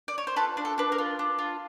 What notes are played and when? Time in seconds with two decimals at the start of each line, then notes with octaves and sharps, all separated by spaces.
0.08 D5
0.18 C#5
0.27 C5
0.36 F4 A4 B4
0.57 D4
0.65 A4
0.78 D4 B4
0.92 A#4
0.98 F4
1.19 D4
1.39 F4